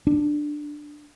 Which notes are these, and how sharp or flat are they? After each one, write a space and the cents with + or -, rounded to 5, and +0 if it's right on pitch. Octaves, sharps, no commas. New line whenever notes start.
D4 +10